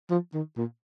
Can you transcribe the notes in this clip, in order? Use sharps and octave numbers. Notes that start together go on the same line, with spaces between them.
F3
D#3
A#2